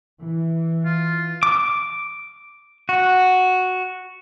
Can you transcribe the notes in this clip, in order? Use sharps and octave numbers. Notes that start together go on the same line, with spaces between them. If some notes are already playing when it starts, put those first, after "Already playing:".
E3
F4
D6
F#4